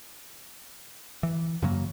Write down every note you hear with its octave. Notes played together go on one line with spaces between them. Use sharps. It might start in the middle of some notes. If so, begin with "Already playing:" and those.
E3
F#2 C#3 F#3 A#3